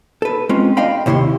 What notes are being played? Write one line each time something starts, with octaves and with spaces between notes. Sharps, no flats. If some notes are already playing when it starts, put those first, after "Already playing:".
A4 B4
G#3 C4 C#4 F4
D4 D#5 F5 G5 B5
D#2 C3 E4 C#5 C6